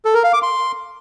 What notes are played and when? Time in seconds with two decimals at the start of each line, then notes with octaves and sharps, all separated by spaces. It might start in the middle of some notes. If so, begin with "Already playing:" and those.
0.05 A4
0.14 A#4
0.24 F5
0.33 D6
0.43 C6